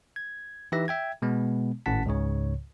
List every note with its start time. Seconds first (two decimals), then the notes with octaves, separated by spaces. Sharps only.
0.16 G#6
0.72 E3 D#4 G4 B4 E5 A#6
0.88 E5 G5 G#6
1.22 B2 G#3 B3
1.86 G#1 A2 C#4 F#5 A5 B6
2.06 C#2 G#2 C#3 C#5